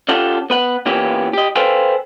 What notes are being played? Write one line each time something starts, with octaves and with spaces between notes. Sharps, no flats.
C#4 F4 G4 A4 F#5
B3 B4 F#5
A#2 E3 A#3 B3 C#4 G4
G4 D#5
A4 B4 C5 F5 G5 G#5